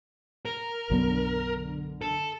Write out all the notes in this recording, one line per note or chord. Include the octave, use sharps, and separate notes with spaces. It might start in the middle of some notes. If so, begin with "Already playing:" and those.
A#4
B1 F#2 D3 B3
A4